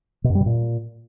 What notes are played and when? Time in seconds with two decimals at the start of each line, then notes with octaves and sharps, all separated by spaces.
0.24 B2
0.30 F#2
0.35 G3
0.41 B2
0.46 A#2